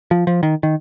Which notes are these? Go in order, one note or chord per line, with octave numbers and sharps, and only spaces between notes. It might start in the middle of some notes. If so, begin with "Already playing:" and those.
F3
F3
D#3
D#3